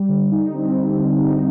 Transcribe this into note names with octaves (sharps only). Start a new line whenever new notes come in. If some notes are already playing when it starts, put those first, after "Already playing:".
Already playing: G3
D3
D#4
C4
G3
D3
D#4